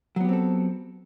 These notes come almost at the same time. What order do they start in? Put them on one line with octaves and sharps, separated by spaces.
F#3 B3 G4 C4 A4